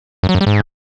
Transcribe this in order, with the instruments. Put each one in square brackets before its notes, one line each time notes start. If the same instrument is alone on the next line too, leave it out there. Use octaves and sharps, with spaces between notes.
[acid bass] F#2
F#3
F#2
G3
G#2